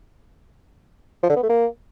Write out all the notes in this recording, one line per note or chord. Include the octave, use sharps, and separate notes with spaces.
F3
D3
B3
A3
A#3